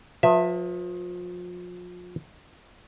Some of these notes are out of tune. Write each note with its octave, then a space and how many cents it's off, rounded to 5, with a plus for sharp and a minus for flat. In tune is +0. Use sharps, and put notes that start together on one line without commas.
F3 +35 B4 +0 E5 +0